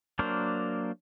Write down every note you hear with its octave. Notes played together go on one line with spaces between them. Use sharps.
F#3 A#3 D4 A#4 C5